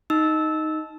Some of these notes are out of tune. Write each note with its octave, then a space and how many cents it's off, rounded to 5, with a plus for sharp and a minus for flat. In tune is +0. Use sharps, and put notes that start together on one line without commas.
D#4 +0 E6 -15